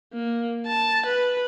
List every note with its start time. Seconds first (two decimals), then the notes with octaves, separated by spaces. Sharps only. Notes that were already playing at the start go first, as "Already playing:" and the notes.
0.13 A#3
0.67 A5
1.06 B4